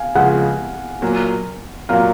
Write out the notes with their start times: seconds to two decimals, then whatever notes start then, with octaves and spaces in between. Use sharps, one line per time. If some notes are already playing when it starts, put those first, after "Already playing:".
Already playing: F5 G#5
0.15 C#2 C#3 F3 G#3 F#5
1.02 A#2 F#3 A#3
1.89 A#2 F#3 A#3 F5